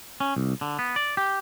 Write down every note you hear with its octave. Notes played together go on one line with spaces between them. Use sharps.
C#4
C2
D3
B3
D5
G4